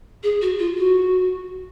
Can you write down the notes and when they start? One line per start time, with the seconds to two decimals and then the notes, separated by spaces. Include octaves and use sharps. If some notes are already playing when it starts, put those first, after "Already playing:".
0.23 G#4
0.42 F#4
0.59 F4
0.77 F#4